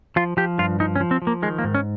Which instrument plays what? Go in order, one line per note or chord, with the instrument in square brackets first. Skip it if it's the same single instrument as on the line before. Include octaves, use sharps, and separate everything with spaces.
[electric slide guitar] F3 F4
F3 G4
G2 F4
F3 D#4
C#4
F3
C4
F3
A#3
D#3 G#3
A#3
G#2
C#4